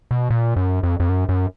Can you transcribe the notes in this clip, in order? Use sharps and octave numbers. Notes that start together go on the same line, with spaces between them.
B2
A#2
F#2
F2
F2
F#2
F#2